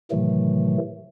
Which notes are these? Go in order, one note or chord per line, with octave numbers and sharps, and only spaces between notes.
A2 C3 D#3 E3 F#3 A3